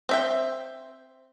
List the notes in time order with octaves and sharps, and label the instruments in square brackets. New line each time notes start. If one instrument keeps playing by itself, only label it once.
[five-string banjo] C4 E5 G5